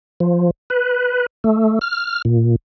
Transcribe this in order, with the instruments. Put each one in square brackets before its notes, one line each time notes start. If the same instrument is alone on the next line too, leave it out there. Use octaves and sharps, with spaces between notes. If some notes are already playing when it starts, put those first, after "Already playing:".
[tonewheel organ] F3
B4
A3
F6
A#2